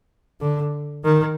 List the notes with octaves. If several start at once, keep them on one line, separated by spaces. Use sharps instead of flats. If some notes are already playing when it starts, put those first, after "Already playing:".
D3
D#3